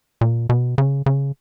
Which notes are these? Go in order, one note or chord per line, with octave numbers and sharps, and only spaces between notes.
A#2
B2
C#3
C#3